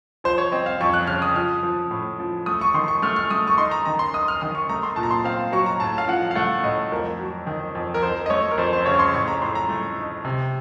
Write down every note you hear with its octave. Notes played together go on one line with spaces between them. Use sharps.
F3 C5
C#5
C4 D#5
F5
F2 C#6
F#6
C#3 F6
D#6
F3 F6
F3
A2
F3
A3 D#6
C#6
D#3 C6
C#6
A3 F6
F6
A3 D#6
C#6
D#4 C6
A#5
D#3 A#5
C6
D#4 D#6
F6
D#3 D#6
C#6
A3 A#5
C6
A#2 A5
A#5
C6
C4 F5
F#3 C#6
A#5
A2 A5
F5
F3 F#5
F5
A3 F#5
A2 D#5
F2 A#4
F#3
D#3
F2
A#4
F2 C5
D#5
A3 C#5
A#4
F2 C5
C5
C#3 C#5
C#6
C6
A2 C#6
A#5
A2 C6
A#5
A3
D#4
C3